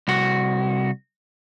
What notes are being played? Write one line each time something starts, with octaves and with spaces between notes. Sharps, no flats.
C2 F#4